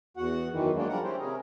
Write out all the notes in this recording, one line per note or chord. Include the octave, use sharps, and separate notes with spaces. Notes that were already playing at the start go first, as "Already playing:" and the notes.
E2 F#4 F#5
F#2 D#3 E3
F#3 G#3 A#3 D4
F3 G3 D4 A#4 F#5 A#5
C#4 E4 G4 C5
C3 C#4 G#4 A#4